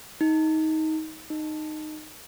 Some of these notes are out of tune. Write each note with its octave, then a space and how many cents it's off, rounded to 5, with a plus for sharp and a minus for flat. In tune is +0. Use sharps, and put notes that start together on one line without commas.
D#4 +20
D#4 -15